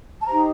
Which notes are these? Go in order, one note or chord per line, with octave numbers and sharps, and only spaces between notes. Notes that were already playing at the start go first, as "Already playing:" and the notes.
A5
D#4 G4 C5 A#5